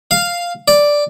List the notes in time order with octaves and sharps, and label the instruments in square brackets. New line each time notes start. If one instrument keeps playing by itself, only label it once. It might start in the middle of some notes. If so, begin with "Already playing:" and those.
[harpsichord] F5
D5